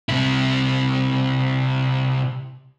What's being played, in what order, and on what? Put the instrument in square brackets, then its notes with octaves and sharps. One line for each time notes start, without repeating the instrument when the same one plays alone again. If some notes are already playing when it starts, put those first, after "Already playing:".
[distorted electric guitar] C3 E4